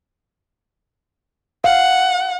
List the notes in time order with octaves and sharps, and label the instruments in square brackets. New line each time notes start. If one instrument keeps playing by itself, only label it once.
[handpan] F5 [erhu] F#5